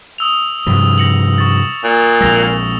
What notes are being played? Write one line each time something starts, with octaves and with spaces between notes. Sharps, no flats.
D#6 E6 F7
G2 C3 F3
A#6 C#7 F#7
C#6 A6
A#2
A#1 G#3 E6 A#6 F7